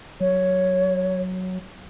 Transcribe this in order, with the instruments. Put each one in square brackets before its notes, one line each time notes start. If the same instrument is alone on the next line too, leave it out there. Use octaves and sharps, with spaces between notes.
[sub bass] F#3 [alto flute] C#5